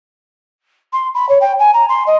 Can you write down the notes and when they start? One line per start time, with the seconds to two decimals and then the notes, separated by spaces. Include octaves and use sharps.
0.92 C6
1.14 B5
1.29 C#5
1.41 G5
1.59 G#5
1.73 A#5
1.88 C6
2.06 D#5